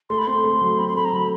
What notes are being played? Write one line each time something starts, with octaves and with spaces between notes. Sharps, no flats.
A3 C6
B5
C4 C6
A3
F#3
C4 B5
C6
A3 B5
A#5
F#3 B5